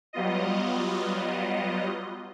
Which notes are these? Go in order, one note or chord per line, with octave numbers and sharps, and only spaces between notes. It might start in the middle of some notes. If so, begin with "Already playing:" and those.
F#3 G3 B3 F4 D#5